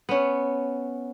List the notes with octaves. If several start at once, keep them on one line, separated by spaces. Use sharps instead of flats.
B3 C#4